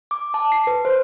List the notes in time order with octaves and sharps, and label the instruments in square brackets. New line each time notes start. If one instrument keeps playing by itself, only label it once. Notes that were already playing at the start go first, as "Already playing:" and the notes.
[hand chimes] D6
A5
C7
B4
C5